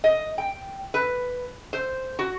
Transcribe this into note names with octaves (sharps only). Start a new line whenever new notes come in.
D#5
G5
B4
C5
F#4